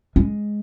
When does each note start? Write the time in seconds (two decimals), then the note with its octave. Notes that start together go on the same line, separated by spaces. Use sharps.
0.16 G#3